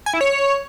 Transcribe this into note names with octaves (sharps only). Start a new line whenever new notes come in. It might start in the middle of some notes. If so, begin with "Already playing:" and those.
G#5
E4
C#5